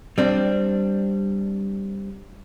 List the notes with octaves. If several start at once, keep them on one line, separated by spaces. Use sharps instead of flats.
G3 C4 D4